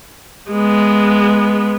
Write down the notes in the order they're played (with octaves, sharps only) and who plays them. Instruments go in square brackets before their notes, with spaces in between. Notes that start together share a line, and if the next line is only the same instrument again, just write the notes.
[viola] G#3 B3